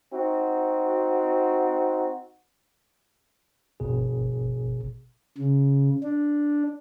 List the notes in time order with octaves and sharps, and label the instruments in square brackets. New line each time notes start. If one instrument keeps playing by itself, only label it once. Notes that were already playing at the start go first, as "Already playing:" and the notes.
[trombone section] C4 D#4 F#4
[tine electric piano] G1 B2 G#4
[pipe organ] C#3
D4